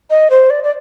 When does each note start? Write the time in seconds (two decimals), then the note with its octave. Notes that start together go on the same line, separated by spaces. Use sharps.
0.10 D#5
0.30 C5
0.50 D5
0.64 D5